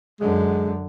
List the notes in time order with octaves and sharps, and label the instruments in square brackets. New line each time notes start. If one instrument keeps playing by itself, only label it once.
[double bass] F#2 D3 [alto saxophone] G#3